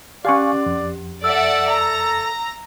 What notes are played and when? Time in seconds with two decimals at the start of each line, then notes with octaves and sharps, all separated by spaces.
0.25 C#4 G4 D5 F5 G#5 C#6
0.66 F2
1.24 A4 D5 E5 F#5 E6
1.71 A#5